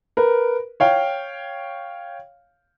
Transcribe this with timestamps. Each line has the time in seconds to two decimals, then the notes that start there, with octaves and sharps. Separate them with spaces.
0.17 A#4 B4
0.80 C#5 F5 G5